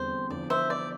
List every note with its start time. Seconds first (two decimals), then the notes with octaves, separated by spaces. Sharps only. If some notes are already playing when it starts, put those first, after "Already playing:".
Already playing: E2 D3 G3 C4 C5
0.29 E2 D3 F3 D5
0.50 C5 E5
0.70 D5